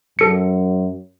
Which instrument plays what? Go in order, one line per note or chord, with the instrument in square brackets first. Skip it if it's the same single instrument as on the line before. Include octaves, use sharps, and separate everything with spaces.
[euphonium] F#2 [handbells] A4 C#7